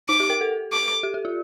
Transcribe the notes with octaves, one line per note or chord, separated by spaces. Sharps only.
D#4 D6
G4
A#4
A4
D6
G4
G4
F4